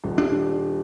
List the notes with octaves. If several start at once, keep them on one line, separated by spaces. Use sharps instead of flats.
D#1
D4